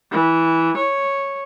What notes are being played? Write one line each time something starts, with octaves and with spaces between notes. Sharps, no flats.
E3
C#5